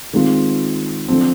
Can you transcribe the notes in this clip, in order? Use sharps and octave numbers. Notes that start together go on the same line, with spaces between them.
D#3 G#3 C4 F4
D3 F3 C4